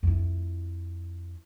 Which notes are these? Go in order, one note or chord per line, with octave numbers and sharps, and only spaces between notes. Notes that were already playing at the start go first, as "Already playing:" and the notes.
F2 E4